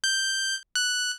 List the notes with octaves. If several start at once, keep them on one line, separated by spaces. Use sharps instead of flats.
G6
F#6